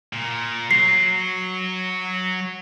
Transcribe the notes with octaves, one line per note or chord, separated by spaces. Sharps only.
A#2
F#3 C7